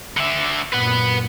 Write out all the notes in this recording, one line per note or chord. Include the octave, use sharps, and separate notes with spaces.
D3 E5
F#2 A#2 B4 F#5